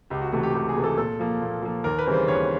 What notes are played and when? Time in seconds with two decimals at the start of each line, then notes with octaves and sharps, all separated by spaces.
0.10 C#2 G4
0.21 F#4
0.32 C3 E3 A3 F#4
0.43 G4
0.54 C#2 G4
0.69 G#4
0.76 C3 E3 A3
0.84 A4
0.97 A#2 A4
1.19 F3 A#3
1.42 A#2
1.63 F3 A#3
1.84 D#2 A#4
1.99 B4
2.06 C#3 E3 G3 C4
2.13 C5
2.28 D#2 C#5